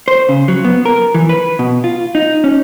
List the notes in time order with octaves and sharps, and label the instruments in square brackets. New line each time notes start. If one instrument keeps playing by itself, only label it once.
[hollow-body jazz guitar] C5
C#3
F#3
B3
A#4
E3
B4
B2
F4
D#4
C#4